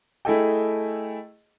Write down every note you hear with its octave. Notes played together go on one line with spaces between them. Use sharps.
A3 E4 G#4 A4 D#5 G5